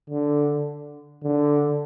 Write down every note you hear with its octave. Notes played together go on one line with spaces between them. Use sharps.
D3
D3